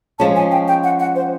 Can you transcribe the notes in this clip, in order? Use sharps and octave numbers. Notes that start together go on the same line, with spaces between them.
F3 G#3 C#4 A5
G#5
G5
G5
F#5
F#5
C5